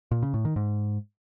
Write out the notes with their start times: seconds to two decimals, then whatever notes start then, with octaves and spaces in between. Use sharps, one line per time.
0.11 A#2
0.23 C#3
0.34 A2
0.45 D#3
0.56 G#2